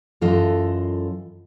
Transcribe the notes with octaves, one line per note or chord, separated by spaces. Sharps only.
F#2 E3 F4 A4 D#5